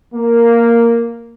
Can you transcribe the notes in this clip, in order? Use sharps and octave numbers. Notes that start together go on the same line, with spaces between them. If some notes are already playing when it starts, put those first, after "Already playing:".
A#3